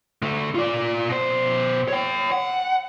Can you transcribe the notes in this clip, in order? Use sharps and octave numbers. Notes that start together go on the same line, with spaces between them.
D3 A3
F4 D5
B2 C5
C#5 G5
F#5